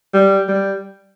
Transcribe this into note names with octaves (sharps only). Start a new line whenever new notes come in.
G3
G3